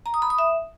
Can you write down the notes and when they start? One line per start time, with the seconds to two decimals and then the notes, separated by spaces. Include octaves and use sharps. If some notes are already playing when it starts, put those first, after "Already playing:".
0.06 A#5
0.14 D#6
0.22 B5
0.30 D#6
0.38 E5